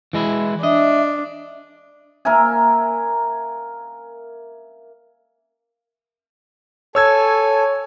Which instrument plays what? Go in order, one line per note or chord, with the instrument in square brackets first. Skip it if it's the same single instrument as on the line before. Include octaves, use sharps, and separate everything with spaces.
[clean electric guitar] E3 G#3 E4
[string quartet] D4 [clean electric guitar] D#5 [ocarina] E5
[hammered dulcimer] A#3 A#4 E5 G#5
[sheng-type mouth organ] A4 G#5 [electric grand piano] C#5 E6 G#6